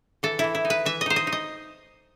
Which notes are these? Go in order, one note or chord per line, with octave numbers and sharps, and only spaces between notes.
E3 A4
E3 E4
E4
D#4
B4
E3 E5
D#5
D#4 C5
D#5
D#4
D#5